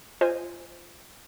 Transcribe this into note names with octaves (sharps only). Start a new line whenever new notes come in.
F4 C5 D#5 G#5